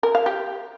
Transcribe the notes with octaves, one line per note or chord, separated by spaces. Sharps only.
A#4
F5
G4